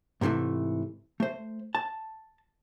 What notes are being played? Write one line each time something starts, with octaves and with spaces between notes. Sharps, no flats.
G#2 C3 D#3 E3 A3
A3 C5
A5